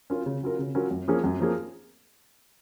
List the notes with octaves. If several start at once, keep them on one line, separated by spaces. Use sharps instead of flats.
F#3 C#4 F4 A#4
C#3
F#3 C#4 F4 A#4
C#3
F#3 C#4 F4 A#4
F#2
F3 A#3 C#4 G#4
F#2
F3 A#3 C#4 G#4